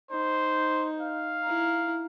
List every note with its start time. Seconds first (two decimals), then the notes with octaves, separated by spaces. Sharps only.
0.11 D#4 C5
1.00 F5
1.44 E4 A#5